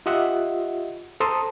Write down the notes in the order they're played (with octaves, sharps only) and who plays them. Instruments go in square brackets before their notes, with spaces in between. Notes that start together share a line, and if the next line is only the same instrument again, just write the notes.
[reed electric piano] F4 G4 D#5 E5 F#5
A4 C5 A5 A#5 C6 D#6